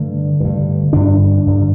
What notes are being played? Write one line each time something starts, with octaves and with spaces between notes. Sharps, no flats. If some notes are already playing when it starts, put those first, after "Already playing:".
Already playing: G2 D3 A3
G2 D3
G2 D3 D4
G2 D3